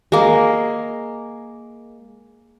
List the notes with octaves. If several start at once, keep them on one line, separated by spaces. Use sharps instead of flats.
G#3 A#3